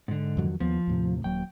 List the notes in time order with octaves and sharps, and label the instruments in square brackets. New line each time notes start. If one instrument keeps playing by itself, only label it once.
[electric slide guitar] G#2 D3
[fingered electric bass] F2 D#3 F#3
[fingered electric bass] D#2 A#3 B3 [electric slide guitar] F3
[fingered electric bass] D#2 A2 C3
[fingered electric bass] D#1 F#3 A#3 [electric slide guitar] G5